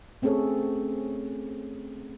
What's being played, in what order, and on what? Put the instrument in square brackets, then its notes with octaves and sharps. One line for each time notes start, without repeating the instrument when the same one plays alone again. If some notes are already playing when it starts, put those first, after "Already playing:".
[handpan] A3 C4 C#4 G#4 A4 C#5